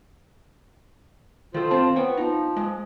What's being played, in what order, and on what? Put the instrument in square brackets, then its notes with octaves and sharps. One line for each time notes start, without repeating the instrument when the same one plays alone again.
[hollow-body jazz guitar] D#3 A4 [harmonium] F4 C5
[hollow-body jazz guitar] C4 A5
[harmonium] B3 [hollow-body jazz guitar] C#5 G5
[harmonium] F3 [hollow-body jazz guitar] D#4
[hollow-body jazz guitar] G#3